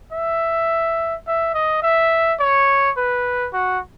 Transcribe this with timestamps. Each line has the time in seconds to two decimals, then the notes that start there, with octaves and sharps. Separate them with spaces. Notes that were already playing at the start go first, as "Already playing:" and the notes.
0.13 E5
1.27 E5
1.54 D#5
1.83 E5
2.40 C#5
2.97 B4
3.53 F#4